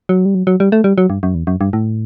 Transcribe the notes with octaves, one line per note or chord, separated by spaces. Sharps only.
F#3
G3
F#3
F#3
G3
A3
G3
F#3
G2
F#2
E2
F#2
G2
A2